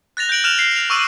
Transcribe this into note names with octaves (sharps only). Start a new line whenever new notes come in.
F#6 A6 A#6 F7
G6 A#6 D7 F#7
F6 F#6 E7 F7
C7 F7
F6 F7
C#6 D6 E6 D#7